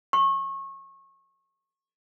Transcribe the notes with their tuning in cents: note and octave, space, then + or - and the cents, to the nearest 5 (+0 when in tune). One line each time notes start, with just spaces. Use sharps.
C#6 -25